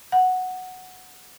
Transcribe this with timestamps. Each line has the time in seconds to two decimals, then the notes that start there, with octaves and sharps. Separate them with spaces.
0.12 F#5